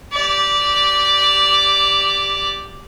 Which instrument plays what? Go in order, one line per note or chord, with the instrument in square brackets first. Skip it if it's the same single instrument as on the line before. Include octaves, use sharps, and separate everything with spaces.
[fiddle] G4 D5